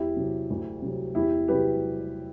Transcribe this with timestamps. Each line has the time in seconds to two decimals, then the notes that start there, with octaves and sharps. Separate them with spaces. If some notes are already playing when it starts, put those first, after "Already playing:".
Already playing: E2 E4 G4
0.17 C3 F#3
0.50 D2
0.82 C3 F#3
1.15 E2 E4 G4
1.48 C3 F#3 G4 B4